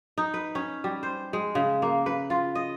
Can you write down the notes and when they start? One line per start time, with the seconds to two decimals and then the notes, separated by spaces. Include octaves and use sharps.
0.18 D#4
0.34 B4
0.55 C#4
0.84 G3
1.03 C5
1.33 G#3
1.55 C#3
1.82 A#3
2.06 B4
2.30 F4
2.55 D#5